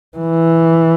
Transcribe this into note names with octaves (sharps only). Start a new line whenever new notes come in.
E3